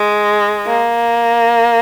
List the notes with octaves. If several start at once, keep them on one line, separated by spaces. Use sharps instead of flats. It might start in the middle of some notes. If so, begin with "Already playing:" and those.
Already playing: G#3
A#3